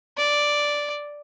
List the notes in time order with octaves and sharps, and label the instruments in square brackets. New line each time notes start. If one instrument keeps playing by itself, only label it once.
[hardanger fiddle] D5